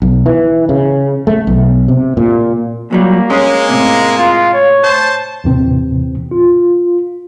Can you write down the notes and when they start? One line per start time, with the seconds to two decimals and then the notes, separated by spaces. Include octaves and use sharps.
0.02 B1
0.26 E3
0.69 C#3
1.27 A3
1.47 B1
1.88 C3
2.17 A#2
2.91 A#2 F#3 G3 A#3
3.31 G#3 C#4
3.69 A2 C3
4.18 F4
4.53 C#5
4.84 C5 A5
5.44 D#2 A2 C3 E3 C4
6.31 F4